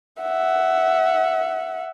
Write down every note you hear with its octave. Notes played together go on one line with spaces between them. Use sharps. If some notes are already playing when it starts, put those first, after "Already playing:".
E5 F#5